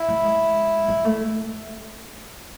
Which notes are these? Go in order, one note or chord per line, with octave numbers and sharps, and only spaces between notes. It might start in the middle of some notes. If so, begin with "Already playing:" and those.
Already playing: E4
A3
G#3
G#3
A3